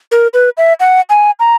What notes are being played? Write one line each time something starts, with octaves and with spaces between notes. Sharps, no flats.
A#4
B4
E5
F#5
G#5
A#5